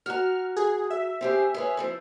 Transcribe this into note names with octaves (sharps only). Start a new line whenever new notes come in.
F#4 A#5 F6
G#4
E5
C4 G4 G#4
G#4 B4 C#5
F3 C4 E4